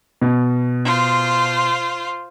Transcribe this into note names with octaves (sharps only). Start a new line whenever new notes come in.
B2
F4 C5